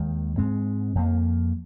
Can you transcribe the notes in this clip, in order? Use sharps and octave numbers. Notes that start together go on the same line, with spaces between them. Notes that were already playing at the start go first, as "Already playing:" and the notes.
Already playing: D#2 D#3 G#3
G#2 G#3 C4
F2 F3 A#3